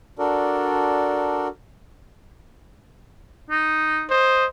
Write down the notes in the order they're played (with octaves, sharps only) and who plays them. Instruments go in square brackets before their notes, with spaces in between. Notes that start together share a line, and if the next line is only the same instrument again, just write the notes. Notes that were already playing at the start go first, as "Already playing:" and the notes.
[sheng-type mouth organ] D4 F#4 A4 A#4 D5
[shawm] D#4
[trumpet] C5 [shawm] D#5